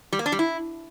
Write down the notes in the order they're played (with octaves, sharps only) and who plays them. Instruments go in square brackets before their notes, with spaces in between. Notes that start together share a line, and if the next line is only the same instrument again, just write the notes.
[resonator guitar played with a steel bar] G3
A#3
D4
G3
E4